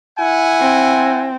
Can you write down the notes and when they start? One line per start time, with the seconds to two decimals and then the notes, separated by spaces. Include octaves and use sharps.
0.18 E4 F#5 G#5
0.60 C4